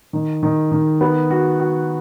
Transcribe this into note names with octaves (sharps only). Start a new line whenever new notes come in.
D#3
D#3
D#3
B3
F#4
F#4